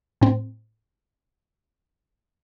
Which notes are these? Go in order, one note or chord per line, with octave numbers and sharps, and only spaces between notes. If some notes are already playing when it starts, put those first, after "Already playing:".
A2 C4